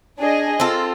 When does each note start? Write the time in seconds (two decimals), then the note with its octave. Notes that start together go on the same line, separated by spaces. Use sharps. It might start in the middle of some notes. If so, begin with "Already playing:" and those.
0.19 D4 G#4 D#5
0.60 C4 F4 A4